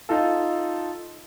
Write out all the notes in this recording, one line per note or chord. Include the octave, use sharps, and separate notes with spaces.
D#4 F4 A4